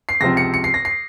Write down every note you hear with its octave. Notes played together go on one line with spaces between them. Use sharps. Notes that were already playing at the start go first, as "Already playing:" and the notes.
C7
C#2 C3 F3 C4 A#6
C#7
C#7
C7
A#6
C7